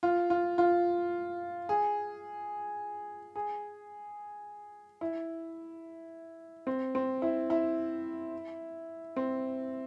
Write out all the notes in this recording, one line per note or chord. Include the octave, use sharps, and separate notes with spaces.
F4
F4
F4
G#4
G#4
E4
C4
C4
E4
E4
C4